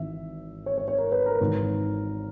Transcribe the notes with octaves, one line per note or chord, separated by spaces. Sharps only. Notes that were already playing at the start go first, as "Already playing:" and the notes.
Already playing: G#1 G#2 E3 E5
C#5
C#5
C#5
A#4
B4
A#4
G#1 G#2 E3